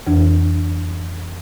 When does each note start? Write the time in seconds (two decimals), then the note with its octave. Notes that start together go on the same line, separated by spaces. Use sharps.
0.07 F2 E3 D4